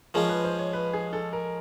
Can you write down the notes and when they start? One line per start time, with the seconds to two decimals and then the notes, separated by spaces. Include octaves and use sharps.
0.14 F3 G#3 C#4 F4 A#4
0.29 B4
0.44 C5
0.59 C#5
0.73 B4
0.93 G#4
1.13 A4
1.33 A#4